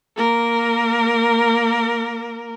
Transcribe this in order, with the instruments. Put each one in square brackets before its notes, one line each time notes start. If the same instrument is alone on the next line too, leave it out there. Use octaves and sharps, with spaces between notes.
[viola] A#3 A#4